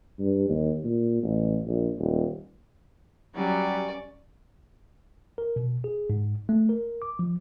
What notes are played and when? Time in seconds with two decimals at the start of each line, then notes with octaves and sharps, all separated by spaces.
0.19 G2
0.49 D#2
0.84 A#2
1.23 A1
1.66 A#1
1.98 D#1
3.35 F#3 G3 C#4 D5
5.38 A#4
5.56 B2
5.84 G#4
6.10 G#2
6.49 A3
6.69 A#4
7.02 D6
7.19 F3